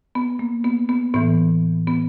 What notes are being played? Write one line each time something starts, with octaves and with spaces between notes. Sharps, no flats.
B3
A#3
B3
B3
A2 E3 B3
B3